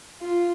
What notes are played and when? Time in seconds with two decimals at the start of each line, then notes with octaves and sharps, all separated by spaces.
0.22 F4